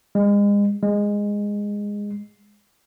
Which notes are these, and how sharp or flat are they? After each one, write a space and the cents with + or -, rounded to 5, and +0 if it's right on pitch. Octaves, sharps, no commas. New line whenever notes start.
G#3 -35
G#3 -15